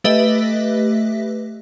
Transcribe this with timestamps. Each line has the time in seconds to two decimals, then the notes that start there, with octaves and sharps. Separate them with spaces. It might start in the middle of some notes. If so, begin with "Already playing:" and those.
0.04 A3 G4 B4 D#5 E5